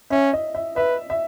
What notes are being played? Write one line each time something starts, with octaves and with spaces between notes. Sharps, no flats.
C#4 E5
D#5
E5
B4 E5
E5